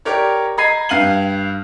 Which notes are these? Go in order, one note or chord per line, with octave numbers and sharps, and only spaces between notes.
G4 A#4 C#5 D5
D#5 A#5 B5 G#6 C7 D#7
G2 F5 C7 D#7 F#7